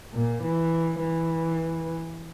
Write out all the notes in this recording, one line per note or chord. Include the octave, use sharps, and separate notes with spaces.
A#2
E3
E3